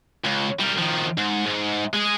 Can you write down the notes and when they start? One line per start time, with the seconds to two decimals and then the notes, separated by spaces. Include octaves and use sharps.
0.24 C#2
0.60 G3 A#4
0.78 D#3 F3
1.17 G#2
1.46 G#2
1.94 G#3 G#4